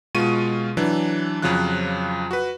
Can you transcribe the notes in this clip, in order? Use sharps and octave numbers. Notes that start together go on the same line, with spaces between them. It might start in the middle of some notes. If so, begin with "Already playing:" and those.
B2 G#3 F4 C#6 D#7
E3 F#3 D4
F2 C#3 F3 F#3 F4 F#6
F#4 B4